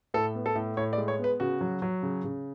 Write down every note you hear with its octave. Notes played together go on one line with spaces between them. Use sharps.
A2 A4
B3
A4
A2
A2 C#5
D5
G#3
C#5
B3
B4
C#3 F#4
F#3
F#3
C#3
C#3